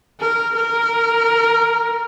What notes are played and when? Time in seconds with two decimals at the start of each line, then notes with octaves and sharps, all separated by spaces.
0.20 A#4
0.55 A#4